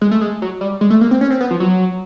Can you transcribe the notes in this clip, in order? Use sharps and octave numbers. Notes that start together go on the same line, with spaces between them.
G#3
A3
G#3
F#3
G3
G#3
A3
A#3
C4
C#4
C4
B3
F3
F#3